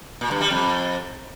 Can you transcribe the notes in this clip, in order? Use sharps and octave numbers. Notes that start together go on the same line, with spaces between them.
A#2
G2
G3
F2